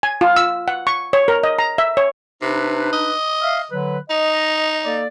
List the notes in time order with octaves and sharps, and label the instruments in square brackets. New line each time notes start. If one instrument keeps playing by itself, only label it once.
[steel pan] G#5
F4
E6
F#5
C#6
C#5
A#4
D#5
A#5
E5
C#5
[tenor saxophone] C3 [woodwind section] D4 D#4 B4
[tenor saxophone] D#5
[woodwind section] E5 F5
D3 F#3 B4
[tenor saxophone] D#4 [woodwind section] D#5
[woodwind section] A#3 A4 D5